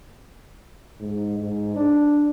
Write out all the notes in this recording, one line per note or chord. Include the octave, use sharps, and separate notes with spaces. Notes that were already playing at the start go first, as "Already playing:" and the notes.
G#2
G#2
D4